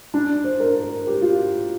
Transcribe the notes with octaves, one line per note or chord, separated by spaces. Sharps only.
D4
C5
A#4
A#4
G4
F4